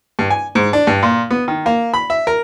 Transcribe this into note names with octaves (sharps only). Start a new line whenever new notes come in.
G2
G#5
G#2
D4
G2
A#2
B3
D#3
A#3
B5
E5
A#4